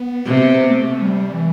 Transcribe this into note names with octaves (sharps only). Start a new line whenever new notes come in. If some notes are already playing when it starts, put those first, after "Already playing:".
Already playing: B3
C3
A3
G3
E3